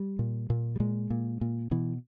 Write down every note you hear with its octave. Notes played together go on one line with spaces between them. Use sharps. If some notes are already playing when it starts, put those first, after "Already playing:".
Already playing: G3
A#2
A#2
G3
A#2 G#3
A#2
A#2
B2 E3